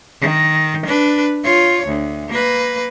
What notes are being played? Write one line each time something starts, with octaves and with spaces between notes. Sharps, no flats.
D#3
D4 B4
F4 C#5
D2
A#3 B4